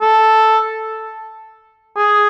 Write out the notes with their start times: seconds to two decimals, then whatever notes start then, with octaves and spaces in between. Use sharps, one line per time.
0.01 A4
1.97 G#4